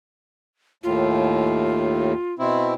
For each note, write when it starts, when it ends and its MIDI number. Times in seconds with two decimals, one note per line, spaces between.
0.84 2.13 39
0.84 2.13 45
0.84 2.34 65
2.39 2.74 47
2.39 2.74 60
2.39 2.74 64